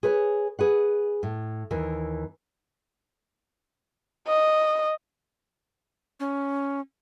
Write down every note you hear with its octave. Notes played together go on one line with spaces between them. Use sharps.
G#4 B4 C#5 G#5
G#4 B4 F#5
A2
D#2 E3 A#4
D#5
C#4